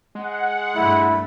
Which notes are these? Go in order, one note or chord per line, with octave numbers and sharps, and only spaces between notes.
G#3 F#5
G2 A3 E4